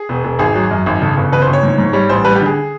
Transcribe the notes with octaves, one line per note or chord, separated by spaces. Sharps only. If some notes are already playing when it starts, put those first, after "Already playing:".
Already playing: G#4
E1
E1
G#1 G#4
F#3
F#2
G#1
C#3 A4
G1
C#3 B4
C5
G1
C#5
G#2
G#2
G3 C#5
A1 C5
G3 B4
G4
D3
G#4